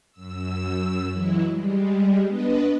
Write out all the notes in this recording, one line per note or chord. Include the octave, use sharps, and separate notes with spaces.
F#2 E6
E3 F#3 G#3 E4
G3 G#3
B3 D4 B4 D#5